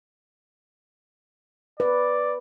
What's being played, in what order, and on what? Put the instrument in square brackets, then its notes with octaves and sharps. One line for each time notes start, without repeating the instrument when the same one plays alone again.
[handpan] B4 [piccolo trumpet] D5